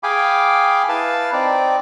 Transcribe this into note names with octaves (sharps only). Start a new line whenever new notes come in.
G#4 F5 G5 G#5 B5 D6
E4 B4 F5 A5
C4 D#4 D5